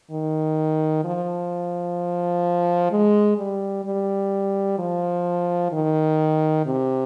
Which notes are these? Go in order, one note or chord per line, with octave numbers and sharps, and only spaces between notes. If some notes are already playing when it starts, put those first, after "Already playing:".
D#3
F3
G#3
G3
G3
F3
D#3
C3